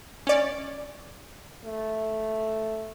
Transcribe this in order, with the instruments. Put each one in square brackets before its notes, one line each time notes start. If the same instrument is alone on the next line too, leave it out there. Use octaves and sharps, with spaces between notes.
[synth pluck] C#4 D5
[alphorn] A3